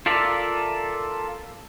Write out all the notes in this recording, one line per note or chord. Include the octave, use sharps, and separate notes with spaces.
F4 A4 A#4 D5 E5